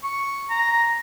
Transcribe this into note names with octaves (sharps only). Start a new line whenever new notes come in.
C#6
A#5